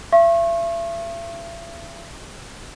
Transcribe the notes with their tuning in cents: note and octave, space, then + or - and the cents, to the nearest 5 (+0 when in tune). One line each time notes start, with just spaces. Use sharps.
E5 +40 C#6 -35